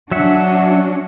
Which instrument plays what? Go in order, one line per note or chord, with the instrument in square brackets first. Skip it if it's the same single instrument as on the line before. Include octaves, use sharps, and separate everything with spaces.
[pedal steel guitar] F#3 E5 F#5 [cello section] C#4 D4 F#4